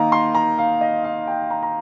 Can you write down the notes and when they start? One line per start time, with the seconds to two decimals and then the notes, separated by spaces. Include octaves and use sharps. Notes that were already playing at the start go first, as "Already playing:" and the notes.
Already playing: D#3 A#3 D#4 D#5 F5 A#5
0.12 C6
0.35 A#5
0.58 F5
0.81 D#5
1.04 F5
1.27 G5
1.50 A#5
1.63 A#5